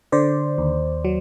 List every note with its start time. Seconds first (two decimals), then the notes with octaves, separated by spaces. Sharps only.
0.12 D3 C5 D5
0.58 D#2
1.05 F#3